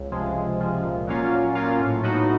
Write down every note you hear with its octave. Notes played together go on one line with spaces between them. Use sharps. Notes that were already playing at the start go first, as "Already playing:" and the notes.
Already playing: C#2
C3 F3 G#3
C#2
C3 F3 G#3
A#2
F#3 A#3 C#4 F4
A#2
F#3 A#3 C#4 F4
A2
F#3 B3 D#4 F#4